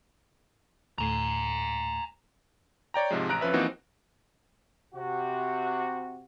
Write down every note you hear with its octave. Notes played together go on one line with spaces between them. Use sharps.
D2 A2 G#5 A#5 C7
C#5 D5 G5 A#5
G#2 C3 F3 G#3
A1 A#5 F#6 D7
F2 F3 C#4 B4 E5
E3 F3 A#3 C4 D#4 F#4
C3 F#4